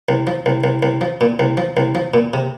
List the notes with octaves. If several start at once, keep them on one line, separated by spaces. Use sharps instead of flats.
C2
F3
C2
C2
C2
F3
A#2
C2
F3
C2
F3
A#2
C3